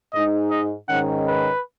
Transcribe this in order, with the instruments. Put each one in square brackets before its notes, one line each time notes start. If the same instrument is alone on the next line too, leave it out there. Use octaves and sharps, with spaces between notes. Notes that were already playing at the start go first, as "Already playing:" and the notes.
[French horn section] G#2 G#3 D#4 [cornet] D#5
[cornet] D#5
[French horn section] G#2 D#3 G#3 C#4 [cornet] F#5
[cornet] B4